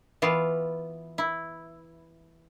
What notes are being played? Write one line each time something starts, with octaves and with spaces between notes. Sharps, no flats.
E3 B3 F4
E4